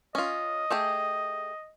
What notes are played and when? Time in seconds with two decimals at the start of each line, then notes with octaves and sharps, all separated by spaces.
0.15 C#4 F4 D#5
0.70 A3 G4 G#4